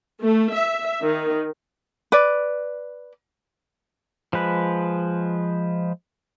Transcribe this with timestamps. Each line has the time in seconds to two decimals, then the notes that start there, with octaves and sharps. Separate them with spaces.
0.25 A3
0.54 E5
1.03 D#3
2.12 B4 D5
4.33 F3 G#3 B4